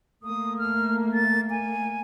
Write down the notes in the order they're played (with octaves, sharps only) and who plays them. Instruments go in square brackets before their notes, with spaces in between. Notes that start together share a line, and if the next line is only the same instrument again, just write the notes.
[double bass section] A3 A#3 [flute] D#6
[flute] F6
A6
G#5